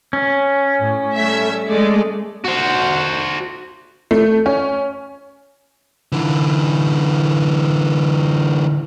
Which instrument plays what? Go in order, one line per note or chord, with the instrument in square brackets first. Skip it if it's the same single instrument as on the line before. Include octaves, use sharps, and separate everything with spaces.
[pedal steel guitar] C#4
[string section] A2
G3 A3 E5
G#3 A3 D5
[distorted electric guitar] F#4 C5
[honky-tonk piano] A3
C#4
[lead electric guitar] D3 E3